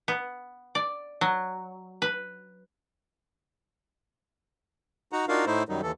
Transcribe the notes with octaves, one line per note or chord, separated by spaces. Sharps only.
B3
D5
F#3
B4
D#4 F#4 F#5 A#5
D4 D#4 F4 F#4 A#4 F5
A2 A3 D#4 E4 C5
F#2 D#3 F#3 G3 D#4
D#2 E3 A4